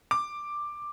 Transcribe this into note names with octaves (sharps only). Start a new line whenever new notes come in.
D6